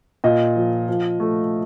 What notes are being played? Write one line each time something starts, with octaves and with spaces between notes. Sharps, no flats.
A#2 D#5
F3
F3
A3